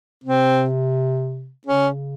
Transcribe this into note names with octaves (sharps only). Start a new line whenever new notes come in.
C3 C4
C#3 C#4